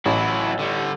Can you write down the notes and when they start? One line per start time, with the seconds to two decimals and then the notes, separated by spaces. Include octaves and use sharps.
0.05 A1 F#3 E4
0.59 D3 G3